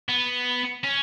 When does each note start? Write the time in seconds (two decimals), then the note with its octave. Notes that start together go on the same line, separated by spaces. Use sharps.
0.09 B3
0.84 C#4